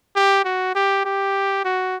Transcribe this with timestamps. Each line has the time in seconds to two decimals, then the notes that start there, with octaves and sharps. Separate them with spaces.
0.16 G4
0.45 F#4
0.75 G4
1.05 G4
1.65 F#4